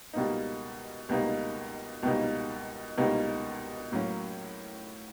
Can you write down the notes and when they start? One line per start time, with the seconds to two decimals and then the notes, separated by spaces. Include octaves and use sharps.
0.13 C#2 B2 G3 A#3 D#4
1.09 C#2 B2 G3 A#3 D#4
2.03 C#2 B2 G3 A#3 D#4
2.97 C#2 B2 G3 A#3 D#4
3.92 A2 F#3 A#3 C#4